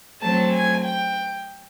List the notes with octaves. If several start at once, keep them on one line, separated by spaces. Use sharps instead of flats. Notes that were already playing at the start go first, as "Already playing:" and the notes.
F#3 A3 C4 A5
G#5
G5